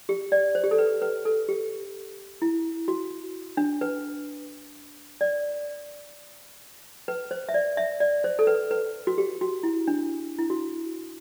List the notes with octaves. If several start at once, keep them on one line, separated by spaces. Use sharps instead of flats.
G4
D5
C5
G4
A4
B4
B4
A4
G4
E4
F#4
D4
B4
D5
B4
C5
E5
D5
E5
D5
C5
A4
B4
B4
F#4
G4
F#4
E4
D4
E4
F#4